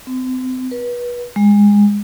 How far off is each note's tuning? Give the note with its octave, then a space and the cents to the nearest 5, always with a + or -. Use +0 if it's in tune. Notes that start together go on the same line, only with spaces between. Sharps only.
C4 -35
B4 -30
G#3 -20